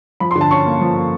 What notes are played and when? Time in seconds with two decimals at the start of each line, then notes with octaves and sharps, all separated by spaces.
0.20 F3 B5
0.31 C6
0.36 D3
0.41 A5
0.51 C#4 C#6
0.66 A#3
0.81 F3
0.96 A#3